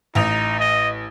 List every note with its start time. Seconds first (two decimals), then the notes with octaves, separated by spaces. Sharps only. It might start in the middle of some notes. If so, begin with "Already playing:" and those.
0.15 A1 D#4 F7
0.60 D#5